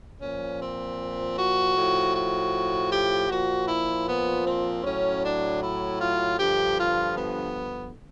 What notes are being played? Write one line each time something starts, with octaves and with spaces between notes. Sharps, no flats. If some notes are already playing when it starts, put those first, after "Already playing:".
A#2 F3 C#4
C4
F#4
A2 F3
F#4
G4
A#2 F3 F#4
E4
B3
C4
A2 F#3 C#4
D4
E4
F4
G2 D3 F3 G4
F4
B3